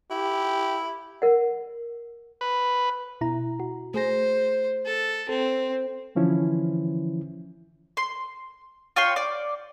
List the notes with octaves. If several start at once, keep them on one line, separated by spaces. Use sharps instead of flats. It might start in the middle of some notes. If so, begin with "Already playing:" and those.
E4 G4
A#4 F#5
B4
B2 E4 A#5
F#4
A3 G#4 C5 A#6
A4
C4 A4
D3 E3 F3 C#4 E4
C6
F4 C#5 G5 C6
D5 D6